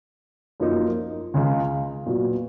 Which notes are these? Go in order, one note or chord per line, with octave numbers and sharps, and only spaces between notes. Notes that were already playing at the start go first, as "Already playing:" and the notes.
F#2 F3 A#3 D#4
C#2 C#3 G#3
A#2 F#3 B3